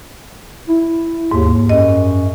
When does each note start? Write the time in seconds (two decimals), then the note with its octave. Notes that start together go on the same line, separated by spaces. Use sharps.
0.68 E4
1.31 D#2 G#2
1.69 F#2 D#5